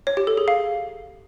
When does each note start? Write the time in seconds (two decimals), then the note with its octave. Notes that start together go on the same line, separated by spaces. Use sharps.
0.07 C#5
0.17 G4
0.27 A4
0.37 G#4
0.48 F5